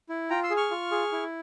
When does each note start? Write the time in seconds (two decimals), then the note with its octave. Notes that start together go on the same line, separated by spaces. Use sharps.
0.09 E4
0.30 F4 G5 A#5
0.43 C6 E6
0.50 G#4
0.57 C#6 F6
0.71 F4
0.91 G#4
1.12 E4